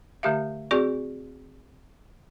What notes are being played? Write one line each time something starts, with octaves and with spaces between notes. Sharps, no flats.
D3 A3 G4 E5 F5
C4 F#4 G#4 D5 C#6